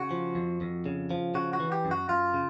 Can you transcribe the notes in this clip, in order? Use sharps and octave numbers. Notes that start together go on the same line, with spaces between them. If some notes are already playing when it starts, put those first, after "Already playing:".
Already playing: C#3 F#4
F3
F2
F2
C#3
F3
C#3 F#4
F#4
E3
G4
F#2
F#4
F#2 F4
C#3